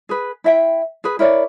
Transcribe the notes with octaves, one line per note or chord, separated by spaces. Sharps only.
G#4 B4
E4 E5 G5
G#4 B4
E4 A#4 C#5 D5